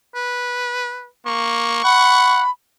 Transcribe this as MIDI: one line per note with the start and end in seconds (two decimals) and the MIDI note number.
0.15 1.07 71
1.26 1.83 58
1.26 2.46 85
1.84 2.43 78
1.84 2.50 83